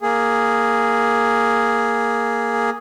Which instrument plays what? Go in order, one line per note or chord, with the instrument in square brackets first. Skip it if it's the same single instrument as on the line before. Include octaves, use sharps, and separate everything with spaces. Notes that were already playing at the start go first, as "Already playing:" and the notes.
[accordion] A#3 G#4